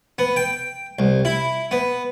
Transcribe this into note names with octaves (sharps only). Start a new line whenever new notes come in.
B3
G5
C2
E4
B3